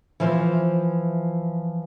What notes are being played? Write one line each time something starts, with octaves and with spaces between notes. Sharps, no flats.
E3 F3 C5